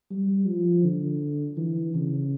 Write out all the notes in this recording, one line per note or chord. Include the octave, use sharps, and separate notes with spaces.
G3
F3
D3
E3
C#3